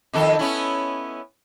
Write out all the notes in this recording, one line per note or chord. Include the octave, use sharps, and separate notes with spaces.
F2 D#3 A4
B3 C#4 E4